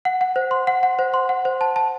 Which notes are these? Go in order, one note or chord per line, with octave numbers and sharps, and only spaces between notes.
F#5
F#5
C5
C6
F#5
F#5
C5
C6
F#5
C5
A5
A5